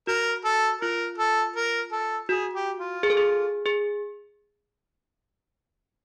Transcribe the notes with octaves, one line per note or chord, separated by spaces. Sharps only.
F#4 A#4
A4
F4 A#4
A4
A#4
A4
F#4 G#4
G4
F4
G#4
A4
G#4
G#4